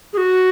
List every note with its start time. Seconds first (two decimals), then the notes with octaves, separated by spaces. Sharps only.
0.13 G#4
0.17 F#4